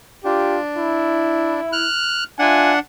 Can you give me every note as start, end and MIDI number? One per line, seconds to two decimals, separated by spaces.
0.25 1.60 62
0.25 0.58 65
0.25 0.58 67
0.77 1.87 64
1.72 2.24 89
1.72 2.24 90
2.39 2.79 62
2.39 2.74 65
2.39 2.74 76
2.39 2.79 78
2.39 2.74 80